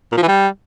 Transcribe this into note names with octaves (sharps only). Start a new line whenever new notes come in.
A#2
F3
E3
G3